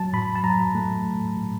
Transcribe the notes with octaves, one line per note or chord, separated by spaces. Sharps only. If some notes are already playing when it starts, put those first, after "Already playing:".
Already playing: F#3 A5
A2 B5
A5
F#3 A#5
A3
A2
A2